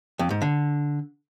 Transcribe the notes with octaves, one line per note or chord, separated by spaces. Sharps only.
F2
G#2
D3